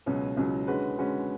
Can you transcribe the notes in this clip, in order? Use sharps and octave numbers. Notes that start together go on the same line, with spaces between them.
C#2 B2 F#3 C#4
C#2 B2 F#3 C#4
D3 G#3 C#4 F#4 B4
D3 G#3 C#4 F#4 B4